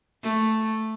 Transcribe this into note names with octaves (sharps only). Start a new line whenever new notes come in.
A3